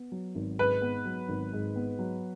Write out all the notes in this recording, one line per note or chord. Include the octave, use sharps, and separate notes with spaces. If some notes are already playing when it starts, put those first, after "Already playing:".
Already playing: B3
F#3
G#1
G#2 B4
B3
F#3
G#1
G#2
B3
F#3